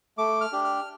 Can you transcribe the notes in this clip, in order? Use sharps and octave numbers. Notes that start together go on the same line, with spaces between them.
A3 D6
F6
D4 G4
F6